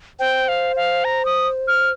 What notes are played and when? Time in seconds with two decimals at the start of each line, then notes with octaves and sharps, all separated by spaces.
0.19 C5 G5
0.48 F5
0.76 F5
1.05 A#5
1.25 D#6
1.68 F6